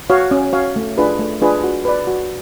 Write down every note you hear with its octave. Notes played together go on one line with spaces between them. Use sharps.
F#4 C#5 F5
C#4
F#4 C#5 F5
A3
D4 F4 G#4 B4
A3
D4 F4 G#4 B4
F#4
B4 D5
F#4